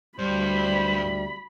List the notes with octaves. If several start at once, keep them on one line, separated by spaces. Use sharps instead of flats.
D2 G2 G3 C5 B5